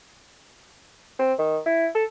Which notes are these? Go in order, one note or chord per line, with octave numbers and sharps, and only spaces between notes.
C4
D#3
E4
A4